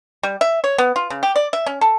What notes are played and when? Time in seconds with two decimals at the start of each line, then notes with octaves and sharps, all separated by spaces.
0.23 G3
0.41 E5
0.64 C#5
0.78 B3
0.96 F4
1.10 C#3
1.23 G4
1.36 D5
1.53 E5
1.66 C#4
1.81 A4